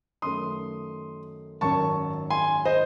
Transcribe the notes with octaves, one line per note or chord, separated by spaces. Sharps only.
F#2 D#3 A3 C6 D#6
G#1 F#2 D#3 A5 C#6
G#5 C6
C5 D#5